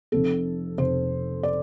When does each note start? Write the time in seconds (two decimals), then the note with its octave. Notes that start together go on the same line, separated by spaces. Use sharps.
0.12 F1 F2 C3 A4
0.78 F1 F2 C3 C5
1.43 D5